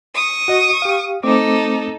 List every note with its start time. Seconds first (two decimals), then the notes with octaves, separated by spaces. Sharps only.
0.15 C#6 D#6
0.48 F#4 D#5
0.82 G4 F5
1.23 A3 C4 D#4 A4 D6